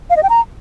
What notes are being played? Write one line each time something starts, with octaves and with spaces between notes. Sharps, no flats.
F5
D#5
G5
A#5